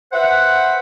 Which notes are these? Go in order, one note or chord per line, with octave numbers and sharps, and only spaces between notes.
B4 C5 E5 F#5